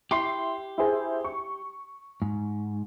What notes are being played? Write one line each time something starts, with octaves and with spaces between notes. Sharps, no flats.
E4 G4 C6 C7
E4 G#4 C5
C#6
G#2